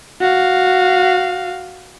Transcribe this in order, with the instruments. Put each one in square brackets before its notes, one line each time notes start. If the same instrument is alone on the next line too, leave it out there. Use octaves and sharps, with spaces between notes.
[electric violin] F#4 F5